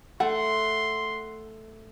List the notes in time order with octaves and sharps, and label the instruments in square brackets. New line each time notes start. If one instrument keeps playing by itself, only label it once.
[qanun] A3 [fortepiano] F#5 [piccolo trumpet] C6